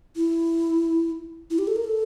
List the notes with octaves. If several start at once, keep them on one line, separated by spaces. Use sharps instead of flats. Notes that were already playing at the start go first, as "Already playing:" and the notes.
E4
E4
G4
A4
A#4
A4